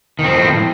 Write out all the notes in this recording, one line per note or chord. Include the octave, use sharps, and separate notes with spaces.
A2 D#3 F3 C4